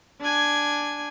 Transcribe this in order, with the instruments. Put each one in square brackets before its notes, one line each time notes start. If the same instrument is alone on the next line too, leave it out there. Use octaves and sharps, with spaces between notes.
[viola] D4 G#5